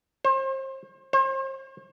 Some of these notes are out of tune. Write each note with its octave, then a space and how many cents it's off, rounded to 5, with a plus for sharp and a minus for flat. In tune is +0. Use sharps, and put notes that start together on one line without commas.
C5 +35
C5 +40